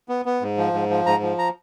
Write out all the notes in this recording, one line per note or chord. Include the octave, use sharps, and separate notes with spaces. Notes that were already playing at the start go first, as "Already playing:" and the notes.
B3
B3
G#2
F3
G#2
F3
G#2 A#5
F3
A#5